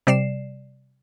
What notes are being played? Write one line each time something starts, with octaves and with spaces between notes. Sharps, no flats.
C3 G3 D5 C7 E7